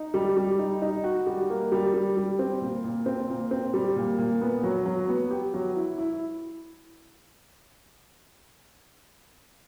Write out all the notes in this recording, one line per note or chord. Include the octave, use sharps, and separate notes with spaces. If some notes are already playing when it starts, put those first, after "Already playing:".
Already playing: D#4
G3
G3
D#4
D#4
F#4
G3
A#3
G3
G3
G3
C4
A#2
A#2
C4
A#2
C4
G3
A#2
A#2
B3
F#3
F#3
B3
G4
F#3
E4
E4